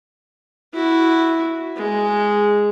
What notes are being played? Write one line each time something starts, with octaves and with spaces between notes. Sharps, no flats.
E4 F#4
G#3